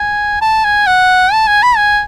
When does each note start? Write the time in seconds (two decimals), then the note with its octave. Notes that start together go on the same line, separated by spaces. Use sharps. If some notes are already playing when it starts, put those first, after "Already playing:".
Already playing: G#5
0.41 A5
0.65 G#5
0.87 F#5
1.33 A5
1.47 G#5
1.63 B5
1.77 G#5